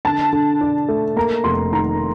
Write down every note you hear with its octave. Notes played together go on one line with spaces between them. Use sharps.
D3 A5
D3
D4
A3
A#3 A#5
F1 C6
D#3 A#5